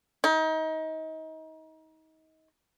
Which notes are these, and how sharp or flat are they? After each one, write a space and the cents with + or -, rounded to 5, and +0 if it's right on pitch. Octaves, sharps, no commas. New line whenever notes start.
D#4 +30